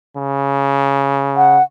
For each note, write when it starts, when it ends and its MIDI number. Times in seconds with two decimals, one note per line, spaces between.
0.17 1.59 49
1.37 1.63 78